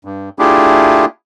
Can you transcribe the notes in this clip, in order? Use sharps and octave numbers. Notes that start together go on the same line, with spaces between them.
G2
A3 D4 E4 F4 G4 G#4